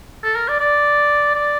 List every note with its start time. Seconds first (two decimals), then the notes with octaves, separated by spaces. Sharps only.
0.23 A4
0.36 A#4
0.48 D5
0.60 D5
1.35 D5